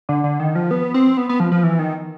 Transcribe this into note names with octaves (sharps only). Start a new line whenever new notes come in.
D3
D3
D#3
F3
B3
C4
B3
B3
F3
F3
E3
D#3